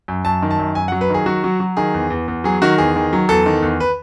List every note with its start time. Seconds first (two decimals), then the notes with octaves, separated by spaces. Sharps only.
0.08 F#2
0.25 F#2 A5
0.43 D#3
0.51 A5
0.59 F#2
0.75 F#2 G#5
0.88 F#5
0.92 F#3
1.01 B4
1.10 D#3 G#4
1.26 F#3 F#4
1.44 F#3
1.60 F#3
1.77 D#3 G#4
1.94 E2
2.10 E2
2.28 E2
2.44 F#3 G#4
2.62 D#3 F#4
2.78 E2 G#4
2.96 D#3
3.13 F#3
3.29 E2 A4
3.46 D#3
3.62 E2
3.80 B4